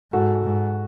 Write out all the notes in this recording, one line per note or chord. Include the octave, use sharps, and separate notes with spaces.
G#2 F#4 A4
G#2